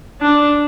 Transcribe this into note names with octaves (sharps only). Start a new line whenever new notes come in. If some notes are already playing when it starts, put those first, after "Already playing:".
D4